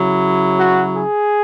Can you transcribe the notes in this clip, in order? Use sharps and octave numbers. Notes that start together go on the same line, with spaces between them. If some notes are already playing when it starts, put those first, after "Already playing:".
Already playing: C#3 F#3 E4
F#4
G#4